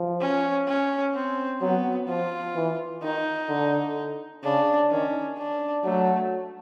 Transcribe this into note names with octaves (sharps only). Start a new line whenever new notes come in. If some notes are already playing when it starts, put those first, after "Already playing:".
Already playing: F3
C#4
C#4
C4
F#3 B3
F3 F4
E3
D#3 D#4
D3
C#3 D4
D#3 C#4
D4
F#3 A3